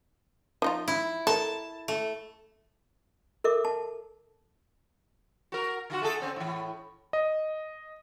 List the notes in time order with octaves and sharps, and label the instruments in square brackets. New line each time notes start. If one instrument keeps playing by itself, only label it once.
[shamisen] F3 D#4 F4
[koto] E4
[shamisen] A4 A#4 [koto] A5
[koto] A3
[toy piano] A4 A#4 E5 D6
A5
[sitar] F#4 A#4
D3 F4 F#4
A3 G#4 A4
D3 C4 C#4
A2 E3
[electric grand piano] D#5